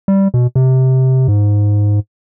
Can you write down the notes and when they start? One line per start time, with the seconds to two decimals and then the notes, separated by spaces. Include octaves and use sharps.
0.08 G3
0.34 B2
0.55 C3
1.28 G#2